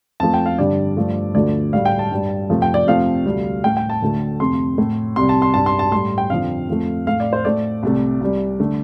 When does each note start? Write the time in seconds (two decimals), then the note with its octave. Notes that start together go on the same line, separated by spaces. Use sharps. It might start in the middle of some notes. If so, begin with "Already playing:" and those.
0.20 F2 F3 A3 A5
0.34 G5
0.46 F5
0.59 G2 D3 G3 D5
0.97 G2 F3 A3
1.35 D2 D3 F3 A3 D5
1.73 A2 G3 F5
1.85 G5
1.99 A5
2.11 G2 G3
2.49 F2 C3 F3 A3
2.62 G5
2.74 D5
2.87 F2 C3 F3 A3 F5
3.26 D2 C3 G3
3.64 A2 A3 G5
3.77 G5
3.90 A5
4.02 D2 D3 A3
4.40 F2 C3 A3 C6
4.78 A2 A3
5.16 C2 C3 G3 C6
5.29 A5
5.42 C6
5.54 G2 G3 A5
5.66 C6
5.79 A5
5.92 A2 G3 C6
6.18 G5
6.30 F2 D3 F3 F5
6.69 F2 F3 A3
7.07 A2 A3 F5
7.20 D5
7.33 C5
7.45 A2 A3 D5
7.83 C2 C3 A3
8.21 C2 C3 G3
8.60 D3 A3